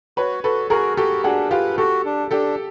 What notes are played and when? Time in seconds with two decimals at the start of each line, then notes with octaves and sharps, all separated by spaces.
0.17 F#4 B4 C#5
0.44 F#4 A4 B4
0.70 F#4 G#4 A#4
0.97 F#4 G4 A4
1.24 D4 F#4 G#4
1.51 F4 G4 B4
1.78 F#4 G4 A4
2.05 D4
2.31 D4 G4 A4